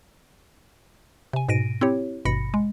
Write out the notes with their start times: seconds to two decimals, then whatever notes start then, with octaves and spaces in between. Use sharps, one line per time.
1.33 C3 G#5
1.49 G#2 B2 A#6 D7 D#7
1.81 C4 E4 G4 C#5
2.25 G#1 G2 B2 B5 A#6 C#7
2.54 G#3